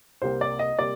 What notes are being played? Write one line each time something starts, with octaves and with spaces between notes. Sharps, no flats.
C2 C3 G3 A#3 C5
D5
D#5
C3 G3 A#3 D5